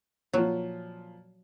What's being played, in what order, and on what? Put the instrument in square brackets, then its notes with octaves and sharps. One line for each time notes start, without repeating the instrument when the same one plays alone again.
[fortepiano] A#2 F3 [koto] F#3